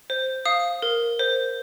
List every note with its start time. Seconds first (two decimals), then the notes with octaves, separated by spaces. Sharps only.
0.10 C5
0.45 F5 D#6
0.82 A#4
1.19 C5